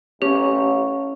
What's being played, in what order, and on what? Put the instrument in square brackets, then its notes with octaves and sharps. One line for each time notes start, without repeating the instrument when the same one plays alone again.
[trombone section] A1 [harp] C#4 [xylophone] G4